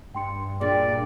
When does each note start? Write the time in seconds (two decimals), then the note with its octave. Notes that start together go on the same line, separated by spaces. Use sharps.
0.15 G2 G5 C6 C#7
0.61 G2 A#2 G#4 D5